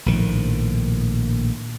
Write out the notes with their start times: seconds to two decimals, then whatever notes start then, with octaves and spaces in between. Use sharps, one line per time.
0.06 A#1 A2 D#3 F3